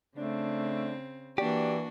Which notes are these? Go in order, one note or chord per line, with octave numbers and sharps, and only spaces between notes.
C#3 A3 C4 D4
E3 A#3 D4 F#4 G4 D5